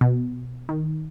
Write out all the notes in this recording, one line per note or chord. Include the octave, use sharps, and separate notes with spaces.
B2
D#3